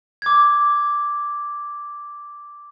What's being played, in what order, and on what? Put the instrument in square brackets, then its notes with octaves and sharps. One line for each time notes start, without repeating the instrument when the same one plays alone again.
[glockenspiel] D6 G#6